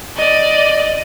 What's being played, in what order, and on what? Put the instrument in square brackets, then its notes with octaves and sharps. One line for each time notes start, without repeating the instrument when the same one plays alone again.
[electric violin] D5 D#5